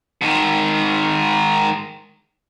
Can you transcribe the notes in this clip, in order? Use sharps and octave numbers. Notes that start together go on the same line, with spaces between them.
G#2 D#3